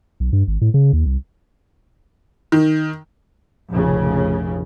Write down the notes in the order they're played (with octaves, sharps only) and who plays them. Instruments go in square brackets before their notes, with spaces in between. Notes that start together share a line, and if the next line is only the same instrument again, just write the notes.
[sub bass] B1
G2
G#1
A2
C#3
D#2
C2
[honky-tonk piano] D#3
[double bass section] F1 A#1 C#3